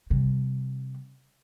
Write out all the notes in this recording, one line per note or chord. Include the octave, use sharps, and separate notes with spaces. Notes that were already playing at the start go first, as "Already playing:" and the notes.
C3 G3